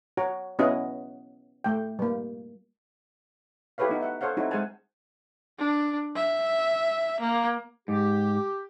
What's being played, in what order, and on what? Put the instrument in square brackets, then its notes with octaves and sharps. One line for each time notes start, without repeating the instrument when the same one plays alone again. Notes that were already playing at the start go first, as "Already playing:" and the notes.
[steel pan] F#4 C#5 A#5
B3 C#4 E4 F#4 D#5 F#5
A3 G5
G3 A#3
E4 G4 A4 B4 C#5 F5
B3 D#4 F#4
E5 F#5
A4 C5 C#5 F5 F#5
C4 D#4 E4 F#4 A4 C#5
G#3 G#4 C5 F#5 G#5 A5
[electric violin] D4
E5
A#3
[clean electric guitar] G#2 [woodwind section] G4